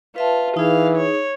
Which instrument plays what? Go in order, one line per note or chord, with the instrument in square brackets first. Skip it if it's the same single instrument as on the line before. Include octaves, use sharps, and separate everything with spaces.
[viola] F4 [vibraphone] B4 E5 A5
[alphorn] E3 [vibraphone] D#4 G#4 [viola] F5
[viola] C#5